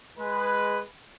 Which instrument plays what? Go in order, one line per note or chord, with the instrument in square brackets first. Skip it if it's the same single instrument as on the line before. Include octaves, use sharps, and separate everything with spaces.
[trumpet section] G#3 B4